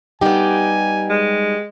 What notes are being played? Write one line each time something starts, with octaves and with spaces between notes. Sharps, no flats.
G3 B3 D#4 G4 G#5
G#3